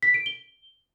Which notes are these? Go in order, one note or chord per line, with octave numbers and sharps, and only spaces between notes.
B6
D7
G7